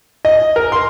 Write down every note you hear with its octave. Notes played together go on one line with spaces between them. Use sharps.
D#5
A#4
C6